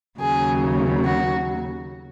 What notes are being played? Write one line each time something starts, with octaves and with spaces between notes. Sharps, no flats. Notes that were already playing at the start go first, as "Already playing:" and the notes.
D#2 C#3 F#3 G#4
F#4